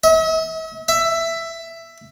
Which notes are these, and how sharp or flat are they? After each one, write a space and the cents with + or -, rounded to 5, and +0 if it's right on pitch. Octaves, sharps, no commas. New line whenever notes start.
E5 -45
E5 +10